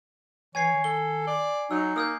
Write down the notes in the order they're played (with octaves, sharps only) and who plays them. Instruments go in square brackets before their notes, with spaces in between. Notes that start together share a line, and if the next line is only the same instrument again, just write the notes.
[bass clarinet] E3 [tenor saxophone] C#5 [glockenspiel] G#5 G#6 C7
[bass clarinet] D#3
[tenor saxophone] A4 [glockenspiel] G7
[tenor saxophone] D5
[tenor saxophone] F#3 [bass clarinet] D#4 [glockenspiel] E6
[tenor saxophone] A#3 [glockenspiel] D#6 E6 G6